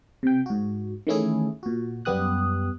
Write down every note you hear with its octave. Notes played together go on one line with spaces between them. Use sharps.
C3 G5
G#2 F#4
D#3 E3 A3 C#4 E4 G#4
A#2 F#4
F#2 G3 B3 G4 D#6 F#6